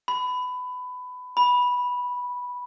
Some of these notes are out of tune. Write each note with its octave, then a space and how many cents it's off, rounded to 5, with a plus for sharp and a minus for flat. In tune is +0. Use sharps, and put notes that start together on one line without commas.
B5 +20
B5 -10